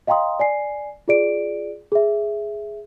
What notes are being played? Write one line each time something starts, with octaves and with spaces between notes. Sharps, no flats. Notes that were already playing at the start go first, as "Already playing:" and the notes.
D#5 F5 G5 A#5 C6 D#6
D5 G#5 C7
F4 G#4 D5 D7
G#4 E5